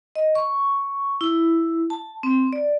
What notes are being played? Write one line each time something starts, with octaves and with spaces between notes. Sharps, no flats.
D#5
C#6
E4
A5
C4
D5